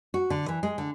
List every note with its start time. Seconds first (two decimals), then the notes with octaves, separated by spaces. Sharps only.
0.14 F#4
0.30 D3
0.48 E3
0.63 G#3
0.78 D3